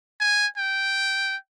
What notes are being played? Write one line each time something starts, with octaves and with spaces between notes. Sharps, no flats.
G#5
G5